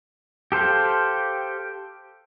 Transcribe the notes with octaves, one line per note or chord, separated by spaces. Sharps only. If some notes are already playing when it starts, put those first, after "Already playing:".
G4 A4 C5 F5